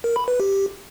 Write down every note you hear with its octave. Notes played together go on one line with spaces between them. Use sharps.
A#4
B5
B4
G4